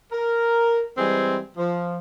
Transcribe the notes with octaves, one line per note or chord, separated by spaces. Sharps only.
A#4
E3 G3 G#3 C4 G#4
F3